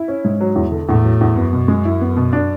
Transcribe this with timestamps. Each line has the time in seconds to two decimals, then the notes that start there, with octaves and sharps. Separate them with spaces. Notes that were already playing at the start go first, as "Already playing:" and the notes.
Already playing: E4
0.08 C#4
0.25 G#2
0.40 F#3
0.56 E2
0.72 D3
0.88 E2 A2
1.04 F#3
1.21 E2
1.37 F#2 B3
1.53 B2
1.68 G#3
1.85 E4
2.01 B3
2.17 B2
2.33 D4